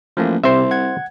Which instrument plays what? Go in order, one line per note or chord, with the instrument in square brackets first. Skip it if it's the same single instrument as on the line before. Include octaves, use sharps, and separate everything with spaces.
[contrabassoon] A1 [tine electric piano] F3 A3 A#3
[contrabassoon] C2 [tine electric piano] C3 [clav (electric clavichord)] C5 E5
[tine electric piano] F#5 G#6